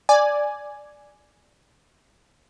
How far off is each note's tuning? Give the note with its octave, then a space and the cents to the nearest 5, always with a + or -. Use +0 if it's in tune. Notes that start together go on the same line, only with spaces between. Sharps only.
D5 +0 G#5 +0